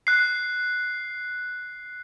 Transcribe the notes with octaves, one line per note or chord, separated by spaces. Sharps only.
F#6 C7